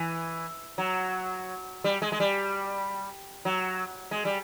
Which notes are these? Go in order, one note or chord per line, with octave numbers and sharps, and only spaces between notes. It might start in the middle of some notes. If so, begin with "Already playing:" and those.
Already playing: E3
F#3
G3
G#3
G#3
G3
F#3
G#3
G3